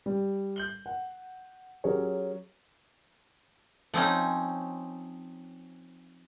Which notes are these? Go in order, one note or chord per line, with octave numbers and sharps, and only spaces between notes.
G3
G6 F#7 G7
F#5
F#3 C#4 G4 G#4 A#4 C#5
F3 C4 C#4 D#4